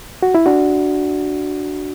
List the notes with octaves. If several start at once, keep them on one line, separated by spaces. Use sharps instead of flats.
F#4
E4
D4 F#4